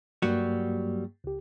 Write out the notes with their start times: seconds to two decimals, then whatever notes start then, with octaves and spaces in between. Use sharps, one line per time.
0.22 G2 F#3 G3 A#3 F#4
1.24 C#2 G4